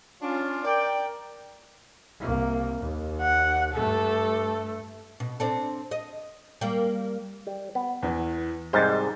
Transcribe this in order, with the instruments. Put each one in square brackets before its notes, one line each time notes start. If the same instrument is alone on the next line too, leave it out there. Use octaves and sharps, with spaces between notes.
[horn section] C#4 D4 F4
A#4 D5 G5
[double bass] C2 A#3
D#2
[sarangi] F#5
[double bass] G2 A3 [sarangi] A4
[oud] B2
C4 D4 A4
D#5
G3 A#3
[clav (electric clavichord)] G3
B3
[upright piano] E2 E3
[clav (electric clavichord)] C2 G#2 G3 [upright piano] C5 D#5 A6